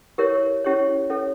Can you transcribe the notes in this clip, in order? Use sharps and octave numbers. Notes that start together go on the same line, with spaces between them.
E4 G4 A#4 C#5
C#4 E4 G4 C#5
C#4 E4 A4 C#5